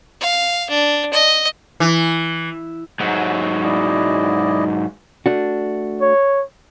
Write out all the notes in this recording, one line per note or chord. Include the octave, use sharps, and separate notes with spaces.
F5
D4
D#5
E3
G#2 F#3
E4 D5 D#5
A3 D4 F#4
C#5